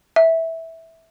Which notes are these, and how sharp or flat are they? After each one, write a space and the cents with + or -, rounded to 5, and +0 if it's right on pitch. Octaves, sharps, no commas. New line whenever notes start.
E5 -10